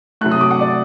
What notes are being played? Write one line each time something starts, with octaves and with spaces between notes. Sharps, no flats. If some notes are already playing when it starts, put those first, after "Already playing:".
C3 F#3 A3 F#6
D#6
D6
F#5
D5